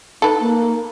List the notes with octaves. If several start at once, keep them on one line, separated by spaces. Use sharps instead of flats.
D#4 A4 B4
A#3